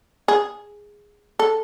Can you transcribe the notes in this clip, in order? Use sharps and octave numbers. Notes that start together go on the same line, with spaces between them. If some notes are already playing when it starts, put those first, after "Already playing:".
G#4
A4